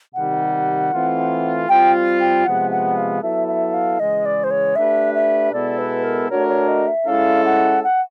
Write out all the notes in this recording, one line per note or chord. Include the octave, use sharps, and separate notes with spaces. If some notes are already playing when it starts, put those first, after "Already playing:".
C3 D#3 G3 F#5
E3 A3 C4 F4
G3 C4 F4 G5
G5
C3 F3 G#3 B3 F#5
F#5
F5
F#3 B3 E4 A4 E5
E5
F5
C#3 E3 G#3 D#5
D5
C5
C#5
A3 D4 G4 B4 E5
E5
B2 G#3 B3 E4 A4 D5
B4
A#4
A3 D4 F#4 A#4 C#5
C#5
D#5
E5
G#3 C#4 E4 A4 F5
F#5
F#5